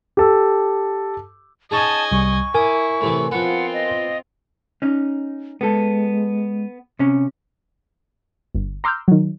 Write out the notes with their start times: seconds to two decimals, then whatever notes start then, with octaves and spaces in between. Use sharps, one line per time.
0.17 G4 A4
1.71 C#4 D#4 G#4 D#5 G#5 A5
2.12 C2 G3 C#6
2.55 E4 A#4 G#5 D6 D#6
3.01 A2 C3 E3
3.31 F3 B3 C4 F4 F#5
3.73 D#5
4.82 C#4 D#4
5.61 G#3 B3 A4
6.99 C3 C#4
8.55 G1
8.84 A#5 C6 D6 E6 F6 G6
9.08 D#3 F#3